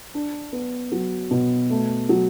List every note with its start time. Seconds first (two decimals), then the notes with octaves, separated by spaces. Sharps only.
0.14 D4
0.52 B3
0.92 F#3
1.31 B2
1.70 A3
2.09 F#3